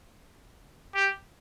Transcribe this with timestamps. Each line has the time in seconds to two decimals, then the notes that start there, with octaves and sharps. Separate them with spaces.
0.96 G4